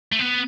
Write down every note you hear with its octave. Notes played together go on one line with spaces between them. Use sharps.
A3
B3